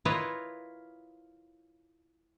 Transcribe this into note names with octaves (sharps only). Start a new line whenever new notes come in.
E4 F4 A#4 B4 C#5 D#5